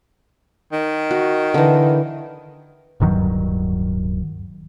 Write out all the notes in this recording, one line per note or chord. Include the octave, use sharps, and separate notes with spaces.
D#3
F#4
D3 E3
D1 G2 D#3 F#3